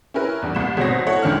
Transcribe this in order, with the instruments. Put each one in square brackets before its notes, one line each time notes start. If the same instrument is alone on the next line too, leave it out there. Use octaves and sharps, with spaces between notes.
[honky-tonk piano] C#4 E4 A#4 B4
E2 G2
C2 E7
G#1 B2 C4 C#5 A#6
E4 A4 C#5 F#5
G1 C#2 D#3 C#4 D4 F6